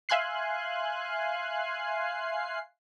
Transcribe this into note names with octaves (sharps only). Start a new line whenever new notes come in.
E5 F5 G#5 C6 F#6 C7